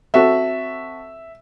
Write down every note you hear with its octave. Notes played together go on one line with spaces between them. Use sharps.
C4 F#4 A4 E5